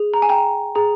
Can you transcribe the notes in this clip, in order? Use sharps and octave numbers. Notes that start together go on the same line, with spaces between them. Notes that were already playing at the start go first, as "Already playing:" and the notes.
Already playing: G#4
A#5
G#5
G5 A#5
G#4 A#5